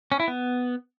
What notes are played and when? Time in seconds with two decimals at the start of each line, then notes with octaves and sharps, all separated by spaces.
0.12 C#4
0.20 E4
0.28 B3